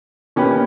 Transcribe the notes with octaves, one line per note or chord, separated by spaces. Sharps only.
B2 A#3 C#4 G4 B4